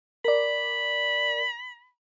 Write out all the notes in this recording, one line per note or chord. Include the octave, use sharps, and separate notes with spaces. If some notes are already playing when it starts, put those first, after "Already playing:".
A#4 D5 B5